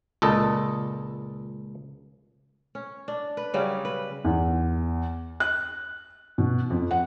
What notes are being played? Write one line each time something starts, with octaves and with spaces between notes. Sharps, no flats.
C#2 A#2 A4 D#5
C#4
D4
B4
C#3 F#3 G3 C#4
B4
E2
F#6
B2
F2
F#5